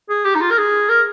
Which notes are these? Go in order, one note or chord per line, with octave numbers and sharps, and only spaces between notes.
G#4
G4
D#4
F4
A#4
G#4
A#4